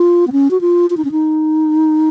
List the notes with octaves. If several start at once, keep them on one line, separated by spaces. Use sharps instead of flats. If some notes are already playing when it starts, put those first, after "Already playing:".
Already playing: F4
B3
C#4
F#4
F4
F4
D#4
C#4
D#4